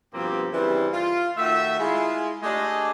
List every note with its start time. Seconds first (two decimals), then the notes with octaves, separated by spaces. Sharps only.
0.14 G2 B2 F3 A#3 C4 G4
0.53 G2 C#3 E3 G3 C4
0.92 F4
1.37 D#3 A3 F#4 E5
1.79 G#3 E4 F4
2.42 G#3 A3 D4 G4 G#4 D#5